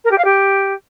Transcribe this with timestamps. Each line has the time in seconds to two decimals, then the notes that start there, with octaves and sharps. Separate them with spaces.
0.04 A#4
0.11 G4
0.18 F5
0.24 G4